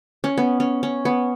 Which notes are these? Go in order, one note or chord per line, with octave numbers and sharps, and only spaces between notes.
C#4
B3
C#4
C#4
B3